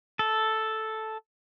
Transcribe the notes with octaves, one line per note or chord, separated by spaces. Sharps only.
A4